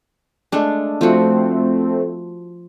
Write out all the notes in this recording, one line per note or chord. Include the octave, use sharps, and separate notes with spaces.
G#3 A3 D4
F3 A3 C4 F#4